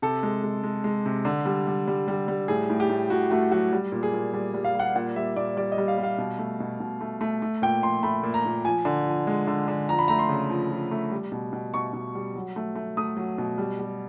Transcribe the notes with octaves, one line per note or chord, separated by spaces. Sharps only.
C3 A4
G#3
G#3
G#3
G#3
C3
D3
G3
G3
G3
G3
G3
A2 G#4
A2
G4
A2
A2 F#4
A3 F#4
F#3 F#4
G3
A#2
G#4
A#2
G3
G3
F5
G3 F#5
A#2 F#5
G3 E5
A#2 D5
G3 D5
D#5
G3
F5
G3
F5
B2
A3
B2
B2
A3
A3
A3
A#2 G5
F3 C6
A3 B5
A#2
A#5
A#2
F3 G#5
D3
F3
G#3
D3
D3
F3 A#5
B5
A3 A#5
C6
C#3
F3
F3
A3
G3
B2
B2
B2 C#6
B2
G3
F#3
A3
A3
A3 D#6
F#3
B2
G3
G3